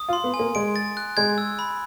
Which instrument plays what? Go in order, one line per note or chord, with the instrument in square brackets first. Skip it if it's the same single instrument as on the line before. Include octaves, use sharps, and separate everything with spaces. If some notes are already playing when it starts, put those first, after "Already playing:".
Already playing: [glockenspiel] D#6
[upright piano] F4
[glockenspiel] C6
[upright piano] B3
[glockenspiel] G#5
[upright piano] A#3
[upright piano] G#3 [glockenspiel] D7
[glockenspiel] A6
F#6
[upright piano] G#3 [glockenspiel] G#6
[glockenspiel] E6
B5